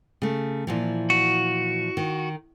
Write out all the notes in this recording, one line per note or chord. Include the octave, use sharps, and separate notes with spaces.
C#3 A3
A#2 E3 F3
F#4
D#3